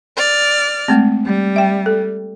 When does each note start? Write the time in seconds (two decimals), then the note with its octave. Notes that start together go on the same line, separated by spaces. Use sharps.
0.17 D5 F6
0.88 G#3 A3 C4
1.26 G3
1.56 E5 G5
1.86 A4